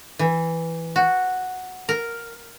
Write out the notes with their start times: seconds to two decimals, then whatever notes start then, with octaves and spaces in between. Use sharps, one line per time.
0.19 E3
0.96 F#4
1.89 A#4